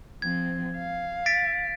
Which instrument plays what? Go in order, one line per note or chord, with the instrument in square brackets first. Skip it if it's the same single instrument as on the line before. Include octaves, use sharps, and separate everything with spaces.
[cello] F3 C4 [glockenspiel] G#6
[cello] F5
[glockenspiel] A6 B6 D7